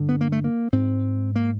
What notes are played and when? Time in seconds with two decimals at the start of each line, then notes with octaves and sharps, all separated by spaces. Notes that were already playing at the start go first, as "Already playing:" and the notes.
Already playing: G2 D3
0.09 B3
0.21 A#3
0.32 A3
0.44 A#3
0.73 G#2 C4
1.36 A#3